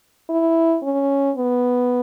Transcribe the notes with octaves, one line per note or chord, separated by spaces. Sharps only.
E4
C#4
B3